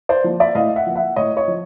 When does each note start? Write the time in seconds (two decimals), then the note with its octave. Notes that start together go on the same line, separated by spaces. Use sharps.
0.09 C5 D5
0.24 F3 A#3
0.40 D5 E5
0.55 A2 D#5 F5
0.76 E5 F#5
0.86 F3 A#3
0.96 E5 F#5
1.16 A2 C#5 D#5
1.37 C#5 D#5
1.48 F3